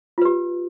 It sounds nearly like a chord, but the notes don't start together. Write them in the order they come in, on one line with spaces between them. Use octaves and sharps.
F4 B4 G4